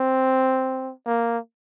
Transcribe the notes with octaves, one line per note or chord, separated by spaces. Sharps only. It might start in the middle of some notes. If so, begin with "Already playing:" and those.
Already playing: C4
A#3